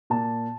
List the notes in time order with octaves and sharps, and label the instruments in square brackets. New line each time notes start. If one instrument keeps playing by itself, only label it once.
[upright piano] A#2 A5